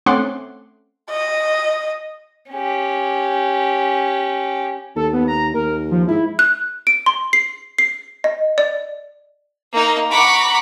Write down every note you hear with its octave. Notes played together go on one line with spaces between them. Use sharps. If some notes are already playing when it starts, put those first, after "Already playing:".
A3 C4 C#4 F#5 C6 D6
D#5
C#4 G4
D#2 A4
B3
A#5
D#2 A#4
F3
G#2 E4
F#6
D7
C6
C7
C7
D#5
D5
A#3 D#4
F#5 A#5 B5 C#6 D6